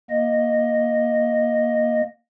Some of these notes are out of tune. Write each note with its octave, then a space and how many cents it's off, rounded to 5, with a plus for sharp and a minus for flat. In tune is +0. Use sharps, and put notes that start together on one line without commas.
A#3 +10 D#5 +0